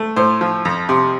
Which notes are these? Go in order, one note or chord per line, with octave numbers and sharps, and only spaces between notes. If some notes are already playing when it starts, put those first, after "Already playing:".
Already playing: A3
A2 C5
F3
F2
C3